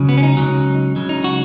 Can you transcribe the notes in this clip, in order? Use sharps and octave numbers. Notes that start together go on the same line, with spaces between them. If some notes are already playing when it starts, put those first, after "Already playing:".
Already playing: C#2 C#3 F#3
B3
C#4
D#4
C#2 C#3 F#3
C#2 C#3 F#3
D#4
F#4